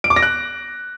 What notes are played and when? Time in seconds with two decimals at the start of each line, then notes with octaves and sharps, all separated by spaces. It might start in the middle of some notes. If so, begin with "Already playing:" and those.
0.04 D7
0.10 D6
0.16 A#6
0.23 F#6